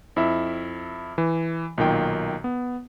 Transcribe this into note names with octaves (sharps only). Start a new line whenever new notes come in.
F2 E4 E5
E3
B1 A#2 D#3 G5
B3